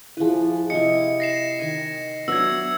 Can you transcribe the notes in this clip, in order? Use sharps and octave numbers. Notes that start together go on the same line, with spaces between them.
F3 E4 G#4 B4
C3 E4 D#5 C#7
A#6 C7 E7
D#3 G#5
F#3 B3 D4 E5 E6 G#6